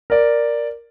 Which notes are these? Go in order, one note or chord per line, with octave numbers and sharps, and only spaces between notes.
A#4 D5